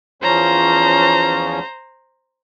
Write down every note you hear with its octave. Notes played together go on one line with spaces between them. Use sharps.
E2 F3 C#4 C5 A#5